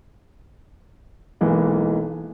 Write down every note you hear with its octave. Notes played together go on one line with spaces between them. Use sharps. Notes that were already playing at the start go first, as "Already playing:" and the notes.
B1 E3 G#3 A#3